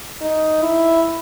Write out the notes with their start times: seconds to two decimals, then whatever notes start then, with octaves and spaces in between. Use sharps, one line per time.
0.22 D#4
0.62 E4